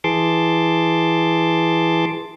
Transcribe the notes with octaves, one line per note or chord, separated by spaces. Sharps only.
E3 G#4 A5 C6 D6